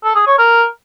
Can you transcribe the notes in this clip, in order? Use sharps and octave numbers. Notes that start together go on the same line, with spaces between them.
A4
G#4
C#5
A#4